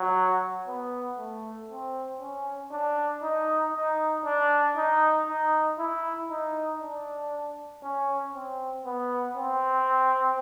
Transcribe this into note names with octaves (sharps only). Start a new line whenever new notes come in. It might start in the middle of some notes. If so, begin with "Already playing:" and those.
Already playing: F#3
B3
A3
C4
C#4
D4
D#4
D#4
D4
D#4
D#4
E4
D#4
D4
C#4
C4
B3
C4